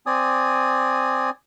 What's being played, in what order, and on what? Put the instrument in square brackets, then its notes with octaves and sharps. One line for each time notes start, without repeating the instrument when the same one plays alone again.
[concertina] C4 D5 G#5 D#6